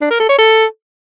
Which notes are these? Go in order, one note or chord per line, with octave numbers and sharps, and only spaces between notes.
D4
A#4
A4
C#5
A4